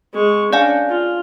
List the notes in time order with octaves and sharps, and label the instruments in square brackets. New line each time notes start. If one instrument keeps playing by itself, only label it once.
[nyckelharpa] G#3 C#6
[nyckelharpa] C#4 D4 [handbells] D5 F5 G#5
[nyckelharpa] F4